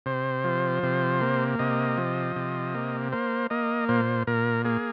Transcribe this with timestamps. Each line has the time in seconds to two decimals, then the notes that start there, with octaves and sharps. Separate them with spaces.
0.06 C3 C5
0.44 F3
0.83 C3
1.21 A#3
1.59 C3 D#5
1.97 F3
2.36 C3
2.75 A#3
3.12 A#3 C5
3.50 A#3 D#5
3.89 A#2 C5
4.27 A#2 A#4
4.65 A#3 G#4